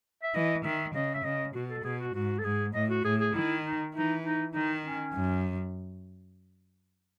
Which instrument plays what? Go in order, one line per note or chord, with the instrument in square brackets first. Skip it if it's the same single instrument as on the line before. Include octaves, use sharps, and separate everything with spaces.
[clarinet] E5
[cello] E3 [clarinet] D#5
[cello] D#3 [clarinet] E5
[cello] C#3 [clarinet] D#5
[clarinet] E5
[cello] C#3 [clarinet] D#5
[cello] B2 [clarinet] F#4
[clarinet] A4
[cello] B2 [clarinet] G#4
[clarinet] F#4
[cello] G#2 [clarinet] F#4
[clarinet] A4
[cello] G#2 [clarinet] G#4
[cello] A2 [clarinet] D#5
[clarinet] F#4
[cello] A2 [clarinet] G#4
[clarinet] G#4
[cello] D#3 [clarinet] E4
[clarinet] D#4
[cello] E3 [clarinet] D#4
[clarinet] D#4
[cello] D#3 [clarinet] D#4
[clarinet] C#4
[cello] F#2